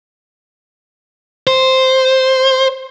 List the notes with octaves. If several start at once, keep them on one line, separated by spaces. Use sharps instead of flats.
C5